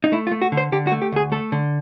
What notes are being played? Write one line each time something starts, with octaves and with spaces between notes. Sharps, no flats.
D#4
A3 E4
F4
A3
F#4
D3
C5
D3 G4
F#4
A3
G4
D2 G#4
A3 A4
D3